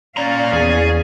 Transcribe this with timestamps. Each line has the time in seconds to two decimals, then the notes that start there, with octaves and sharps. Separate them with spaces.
0.17 A#2 C#4 D5 F5 A#5
0.53 E2 G#4